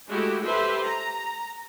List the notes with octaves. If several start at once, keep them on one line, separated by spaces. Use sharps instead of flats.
G#3 A3 E4 F#4 G4
G4 A4 B4 C5 E5
A#5